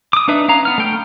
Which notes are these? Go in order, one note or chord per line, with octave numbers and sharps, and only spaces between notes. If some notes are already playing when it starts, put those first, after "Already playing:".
D6 D#6
D4 D#4 B4 E5
C#4 F5 A#5
B3 F6
A3 G5 F6